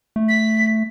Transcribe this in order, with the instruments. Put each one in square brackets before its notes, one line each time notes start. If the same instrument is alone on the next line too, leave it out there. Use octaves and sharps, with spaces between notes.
[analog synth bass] A3
[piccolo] B6